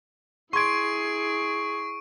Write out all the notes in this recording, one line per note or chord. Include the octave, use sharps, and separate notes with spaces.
E4 G#4 C6 C#6 G#6 C7 D7